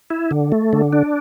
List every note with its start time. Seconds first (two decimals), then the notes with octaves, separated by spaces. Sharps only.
0.10 E4
0.31 D3
0.52 A3
0.73 D3
0.93 D4